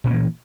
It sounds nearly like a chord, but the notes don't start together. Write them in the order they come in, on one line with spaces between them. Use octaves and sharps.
A#2 C#4 A#3 E3